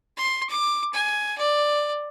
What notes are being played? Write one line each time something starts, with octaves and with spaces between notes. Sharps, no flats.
C6
D6
G#5
D5